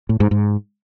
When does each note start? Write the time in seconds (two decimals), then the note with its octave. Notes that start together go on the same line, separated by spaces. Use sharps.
0.09 A2
0.20 G#2
0.31 G#2